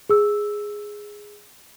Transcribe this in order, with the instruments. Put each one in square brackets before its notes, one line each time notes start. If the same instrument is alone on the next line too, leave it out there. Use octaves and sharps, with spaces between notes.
[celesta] G#4 E6